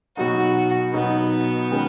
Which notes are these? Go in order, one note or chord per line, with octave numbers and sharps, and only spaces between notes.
B2 F#3 D#4 F#4
B2 F#3 B3 D#4
D#3 G#3 C#4 B4